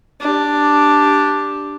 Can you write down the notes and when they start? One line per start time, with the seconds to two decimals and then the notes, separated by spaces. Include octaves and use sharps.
0.20 D4 G4